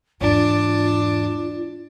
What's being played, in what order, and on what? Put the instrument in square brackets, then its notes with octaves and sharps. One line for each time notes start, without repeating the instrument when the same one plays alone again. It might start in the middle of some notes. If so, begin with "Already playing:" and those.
[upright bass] E2 G#2 [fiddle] D4 [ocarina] F4